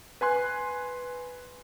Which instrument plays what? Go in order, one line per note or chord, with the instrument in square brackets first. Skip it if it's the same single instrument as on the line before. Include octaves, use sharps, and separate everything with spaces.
[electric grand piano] B4 G#5 C6 F#6